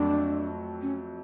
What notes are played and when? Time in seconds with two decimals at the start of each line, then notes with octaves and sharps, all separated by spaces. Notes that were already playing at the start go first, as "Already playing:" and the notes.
Already playing: F2 F#3 A3 D4
0.82 C#4